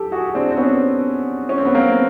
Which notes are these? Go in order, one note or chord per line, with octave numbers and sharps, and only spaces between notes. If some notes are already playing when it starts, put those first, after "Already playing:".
Already playing: G4 A4
F#4 G#4
C4 D4
C4
B3 C#4
C#4
C4
B3
A#3 C4